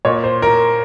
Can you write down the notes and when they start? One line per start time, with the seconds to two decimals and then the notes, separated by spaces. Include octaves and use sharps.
0.05 A#2 C#5
0.24 C5
0.42 A#4